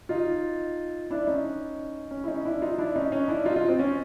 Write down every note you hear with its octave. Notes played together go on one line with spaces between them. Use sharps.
D#4 F4
D4 E4
C#4 D#4
C#4
E4
C#4 D#4
D4 E4
D#4 F4
D4 E4
C#4 D#4
C#4 D#4
D4 E4
D#4 F4
D#4 F4
C4
C#4